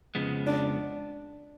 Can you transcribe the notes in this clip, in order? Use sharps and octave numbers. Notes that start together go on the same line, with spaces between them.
F2 C#3 F3 G#3 B3
D4